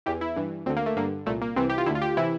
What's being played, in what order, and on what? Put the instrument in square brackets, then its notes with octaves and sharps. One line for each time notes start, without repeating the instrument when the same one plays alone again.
[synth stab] E2 E3 G4
E4
G2 E3
D2 C4
D3
A#3
A3
G2 D3 A#3
C2 A#2 A3
A#3
C2 C3 E3 C4
G4
F4
D2 D3 E4
F4
G4
C3 E3 E4